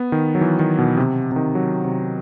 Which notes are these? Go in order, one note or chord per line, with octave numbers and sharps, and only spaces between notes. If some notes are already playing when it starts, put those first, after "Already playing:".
Already playing: B3
D#3
F#3
E3
D#3
B2
C3
C3
D#3
F#3
C3